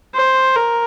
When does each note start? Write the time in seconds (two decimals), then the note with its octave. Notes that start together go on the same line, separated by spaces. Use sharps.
0.15 C5
0.56 A#4